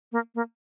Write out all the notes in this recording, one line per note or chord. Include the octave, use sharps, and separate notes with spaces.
A#3
A#3